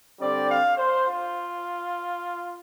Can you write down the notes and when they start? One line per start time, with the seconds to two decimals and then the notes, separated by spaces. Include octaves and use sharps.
0.19 D3 G3 C4 D5
0.48 F5
0.77 C5
1.06 F4